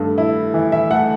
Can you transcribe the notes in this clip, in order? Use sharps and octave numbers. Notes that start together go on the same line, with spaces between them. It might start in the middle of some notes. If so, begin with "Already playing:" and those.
Already playing: G2 A3
E4
E3
E5
A3 F#5